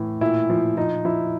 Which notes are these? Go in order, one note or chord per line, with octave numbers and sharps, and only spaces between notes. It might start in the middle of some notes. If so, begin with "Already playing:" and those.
Already playing: A2 E3
A#2 E4
F3
F3 D#4
F3 E4